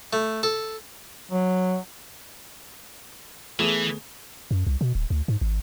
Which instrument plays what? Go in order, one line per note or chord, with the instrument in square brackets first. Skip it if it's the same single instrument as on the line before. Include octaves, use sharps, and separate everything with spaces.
[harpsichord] A3
A4
[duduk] F#3
[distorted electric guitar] E3 [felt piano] A3 B3 G#4
[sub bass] F#2
C2
B2
D1
D2
G#2
G#1